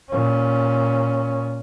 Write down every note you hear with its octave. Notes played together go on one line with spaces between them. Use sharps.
A#2 C#4